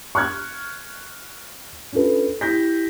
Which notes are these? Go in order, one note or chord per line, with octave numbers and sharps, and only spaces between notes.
C#6 F6 F#6 G#6
C#4 D4 F4 A4 B4
E4 G4 G6 A#6 B6